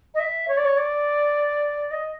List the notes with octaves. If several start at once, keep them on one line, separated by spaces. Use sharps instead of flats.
D#5
E5
C#5
D5
C#5
D5
D#5